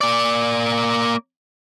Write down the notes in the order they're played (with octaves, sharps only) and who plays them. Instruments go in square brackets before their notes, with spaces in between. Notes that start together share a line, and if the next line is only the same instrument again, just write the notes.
[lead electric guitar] A#3 D5